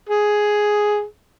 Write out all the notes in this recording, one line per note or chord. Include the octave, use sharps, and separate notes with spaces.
G#4